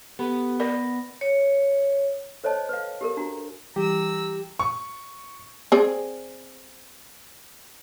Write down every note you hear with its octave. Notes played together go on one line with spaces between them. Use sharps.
B3 G4 A4 B5
A#4 D5 B5 A#6
C#5
A4 C5 C#5 D#5 A5
B4 F5
G4 A4 A#4
D4 F#4 A#5
E3 G3 G4 A#5 E6
C#6
C4 G#4 D5